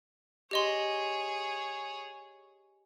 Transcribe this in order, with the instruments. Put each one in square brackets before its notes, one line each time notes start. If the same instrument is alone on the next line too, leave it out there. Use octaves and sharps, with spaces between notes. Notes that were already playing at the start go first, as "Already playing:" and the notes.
[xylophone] G4 D#5 C6 [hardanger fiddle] G#4 C#5